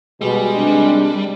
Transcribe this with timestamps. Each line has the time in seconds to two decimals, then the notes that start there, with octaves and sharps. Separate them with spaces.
0.22 B2 G3 G#3
0.55 G#1 C3 D4